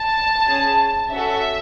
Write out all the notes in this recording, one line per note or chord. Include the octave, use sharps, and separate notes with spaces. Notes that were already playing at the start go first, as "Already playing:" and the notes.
Already playing: A5
C#4 G#4
C#4 F#4 A4 E5